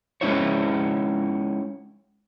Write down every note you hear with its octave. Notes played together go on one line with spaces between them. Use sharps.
G#3 C#4 D#4 E4 C5 C#5